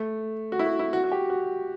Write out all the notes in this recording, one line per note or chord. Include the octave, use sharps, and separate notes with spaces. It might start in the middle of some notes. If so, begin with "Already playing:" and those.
Already playing: A3
F#4
E4
F#4
E4
F#4
F#4
G4
F#4